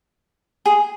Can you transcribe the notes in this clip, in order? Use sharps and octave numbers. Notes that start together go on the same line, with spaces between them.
G#4